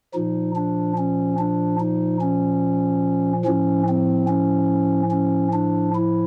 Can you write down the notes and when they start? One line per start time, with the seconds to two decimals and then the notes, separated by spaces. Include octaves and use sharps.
0.14 A#2 F3 D#4
0.56 D4
0.98 C#4
1.39 D4
1.80 D#4
2.21 C#4
3.45 A2 F3 C#4
3.88 C4
4.28 C#4
5.11 C#4
5.53 D4
5.95 E4